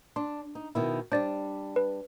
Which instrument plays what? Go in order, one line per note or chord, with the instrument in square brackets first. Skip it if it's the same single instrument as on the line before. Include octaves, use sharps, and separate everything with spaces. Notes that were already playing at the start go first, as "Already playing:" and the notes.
[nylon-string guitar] D4 [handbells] C6
[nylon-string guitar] D#4
B2 D#3 E4
[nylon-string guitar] G3 D4 [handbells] C5 D5
[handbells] B4